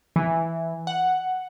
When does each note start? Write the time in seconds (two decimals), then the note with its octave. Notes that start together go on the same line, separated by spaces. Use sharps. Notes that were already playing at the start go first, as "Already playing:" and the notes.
0.16 E3
0.87 F#5